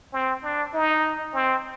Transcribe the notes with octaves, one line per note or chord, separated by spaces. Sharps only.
C4
D4
D#4
C4